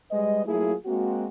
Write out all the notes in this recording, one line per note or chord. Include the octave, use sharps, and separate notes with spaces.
G3 G#3 B4 D#5
F#3 A3 A#3 E4 F4 G#4
G#3 A#3 C4 F#4